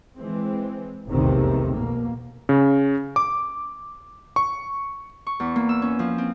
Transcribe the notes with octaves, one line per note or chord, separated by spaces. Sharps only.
E3 G#3 C4
F1 B1 E2 A2 C3 D#3
B2 A#3
C#3
D6
C#6
C#6
E2
A#3
E6
C#4
F3
C4